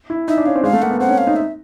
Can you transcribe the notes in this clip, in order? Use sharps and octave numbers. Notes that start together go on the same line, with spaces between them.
E4
D#4 E5
D4
C#4 F5
C4
G#3 F5
A3
A#3 F#5
B3
C4 F#5
C#4
F5
D#4
E5